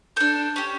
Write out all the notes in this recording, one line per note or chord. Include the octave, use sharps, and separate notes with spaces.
D4 A4 G6
C#4 G4